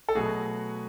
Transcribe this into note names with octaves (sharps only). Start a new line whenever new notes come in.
A4
B2 F#3 A3 F#4 G#4